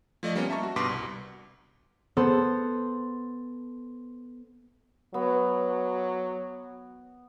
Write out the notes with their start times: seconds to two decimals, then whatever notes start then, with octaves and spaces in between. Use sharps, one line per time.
0.23 F3 A3 D5 D#5
0.35 G3 A#3 B3 C#4
0.50 E5 A5 A#5 C#6
0.63 F#4
0.76 G2 B2 C6 D6 B6
0.89 C2
2.17 B3 A4 C5
5.14 F#3 B3